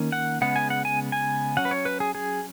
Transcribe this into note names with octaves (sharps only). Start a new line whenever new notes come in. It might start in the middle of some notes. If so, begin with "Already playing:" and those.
Already playing: D#3 A#3 C#4
F#5
C#3 G#3 B3 F#5
G#5
F#5
G#5
G#5
F#3 C#4 F#5
B4
C#5
B4
G#4
G#4